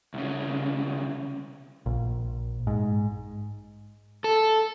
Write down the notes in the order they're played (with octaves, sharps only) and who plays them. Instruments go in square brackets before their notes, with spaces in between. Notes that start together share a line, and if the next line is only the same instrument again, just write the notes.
[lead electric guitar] C2 C#3
[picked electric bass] A#1
G#2
[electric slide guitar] A4